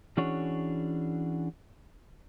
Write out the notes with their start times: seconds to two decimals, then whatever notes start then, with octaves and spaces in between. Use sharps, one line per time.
0.17 E3 C#4 D4 F#4 G#4 C#5